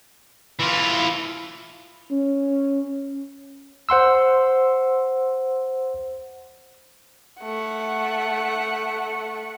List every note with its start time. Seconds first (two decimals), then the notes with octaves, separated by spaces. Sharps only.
0.60 E3 F4
2.11 C#4
3.89 C5 F#5 C6 E6
7.42 A3 F#5